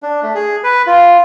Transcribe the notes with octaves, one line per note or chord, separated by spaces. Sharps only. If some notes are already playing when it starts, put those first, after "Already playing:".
D4
A3
G#4
B4
F4